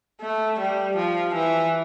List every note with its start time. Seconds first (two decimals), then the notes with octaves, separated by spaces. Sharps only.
0.21 A3
0.59 G3
0.96 F3
1.34 E3